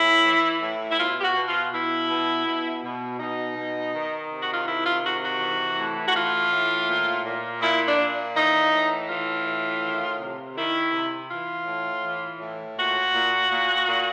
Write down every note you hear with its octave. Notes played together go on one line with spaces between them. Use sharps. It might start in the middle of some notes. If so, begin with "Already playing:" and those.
Already playing: A2 E4
E3
A2
E4
B2 F4
G4
F#4
B2
F4
B2 E4
B2
B2
B2
B2 D#4
B2
D#3
C3
F#4
F4
D#3 E4
F4
C3 F#4
F#4
E3
A2
F#4
E3 F4
A2
A#2
A#2
A#2 E4
D4
A#2
E3 D#4
A2
E3 F4
A2
D#3
C3
D#3 E4
C3
E3 F4
A2
E3
A2
A#2 F#4
A#2
A#2
A#2